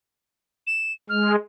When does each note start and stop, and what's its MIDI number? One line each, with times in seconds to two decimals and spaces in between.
0.67 0.93 100
1.09 1.35 56
1.09 1.32 89